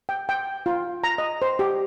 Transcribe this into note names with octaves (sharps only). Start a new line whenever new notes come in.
G5
G5
F4
A#5
D#5
C5
G4